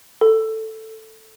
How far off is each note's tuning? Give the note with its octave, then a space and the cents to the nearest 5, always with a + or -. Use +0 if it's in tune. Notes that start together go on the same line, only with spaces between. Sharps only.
A4 +5